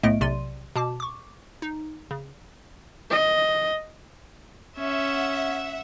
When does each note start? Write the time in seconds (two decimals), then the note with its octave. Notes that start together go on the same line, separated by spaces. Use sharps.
0.03 B1 A2 A3 B3 D#5 D7
0.21 B1 C3 D5 C6 D#7
0.76 B2 A5 D6
1.00 C#6 D6
1.62 D#4
2.11 C#3
3.10 D#5
4.79 C#4 E5 F#5